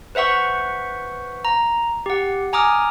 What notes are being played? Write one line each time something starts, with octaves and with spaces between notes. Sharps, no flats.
B4 C5 E5 F#5 C#6
A#5
G4 F#5
G#5 A#5 D6 D#6 F6